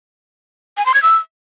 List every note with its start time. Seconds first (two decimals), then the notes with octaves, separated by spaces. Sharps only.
0.77 G#5
0.86 C6
0.94 G#6
1.03 E6